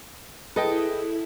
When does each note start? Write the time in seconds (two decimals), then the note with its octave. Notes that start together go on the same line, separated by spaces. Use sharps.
0.56 E4 G#4 A4 B4 D#5 G5